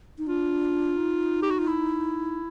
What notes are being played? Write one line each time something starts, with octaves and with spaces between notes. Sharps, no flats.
D#4
D4 F4
D#4
G4
F#4
F4
E4